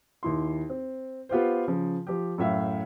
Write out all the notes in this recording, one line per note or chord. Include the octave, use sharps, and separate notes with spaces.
D#2 E4 C6
C4
B3 F4 G4 C5
C#3 F3
F3 G4
F#2 A2 E5 F5